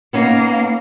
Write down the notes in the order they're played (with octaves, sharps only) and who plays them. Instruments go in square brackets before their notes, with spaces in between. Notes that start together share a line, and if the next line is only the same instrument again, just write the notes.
[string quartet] A#3 [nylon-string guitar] B3 C#4 D#4